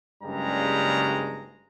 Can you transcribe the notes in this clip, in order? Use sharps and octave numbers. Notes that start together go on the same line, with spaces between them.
F#1 G2 C#3 G3 G#3 A#5